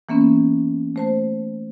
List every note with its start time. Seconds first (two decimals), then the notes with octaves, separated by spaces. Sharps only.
0.09 E3 A#3 B3 C#4
0.96 A3 C5 A5